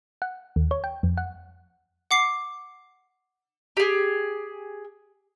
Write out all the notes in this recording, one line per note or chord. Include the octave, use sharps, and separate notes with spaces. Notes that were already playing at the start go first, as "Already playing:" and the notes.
F#5
D#2
C#5
G5
F2
F#5
F#5 D6 C7
G4 G#4